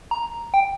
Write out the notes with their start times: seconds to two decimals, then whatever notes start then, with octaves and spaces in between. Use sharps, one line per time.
0.11 A#5
0.54 G5